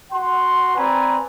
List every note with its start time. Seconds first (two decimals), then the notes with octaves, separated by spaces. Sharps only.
0.12 F#4 F#5 C6
0.76 C4 B4 D5 G#5 A#5